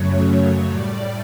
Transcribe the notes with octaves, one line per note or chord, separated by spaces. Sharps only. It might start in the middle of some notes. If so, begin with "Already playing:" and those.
Already playing: F#2 C#3 F#3 A3 C#5
A2 G3 D5